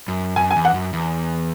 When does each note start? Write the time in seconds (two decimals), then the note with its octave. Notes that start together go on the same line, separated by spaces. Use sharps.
0.08 F#2
0.36 F#2 G#5
0.51 G#5
0.56 E2
0.65 F#5
0.74 F#2
0.93 E2